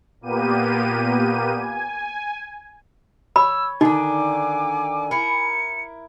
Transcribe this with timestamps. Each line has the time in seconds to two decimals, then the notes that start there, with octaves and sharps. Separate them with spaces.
0.21 A#2 A#3 B3 G4 D#7
1.56 G#5
3.36 C#5 B5 E6
3.81 D3 D#3 D#4 G#5 D6
5.11 E4 A#4 C#7